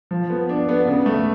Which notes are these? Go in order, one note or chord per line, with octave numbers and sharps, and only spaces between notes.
F3
B3
D4
B3
C#3
A3